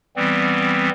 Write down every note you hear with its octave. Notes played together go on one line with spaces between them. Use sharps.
E3 G3 B3 C4